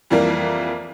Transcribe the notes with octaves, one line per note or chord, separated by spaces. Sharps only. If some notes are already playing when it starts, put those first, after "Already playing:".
F2 E3 G3 A#3